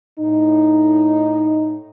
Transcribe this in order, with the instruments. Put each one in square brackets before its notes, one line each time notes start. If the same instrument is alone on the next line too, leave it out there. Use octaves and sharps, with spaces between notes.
[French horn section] A2 D#4